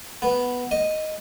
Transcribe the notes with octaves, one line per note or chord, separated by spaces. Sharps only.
B3
D#5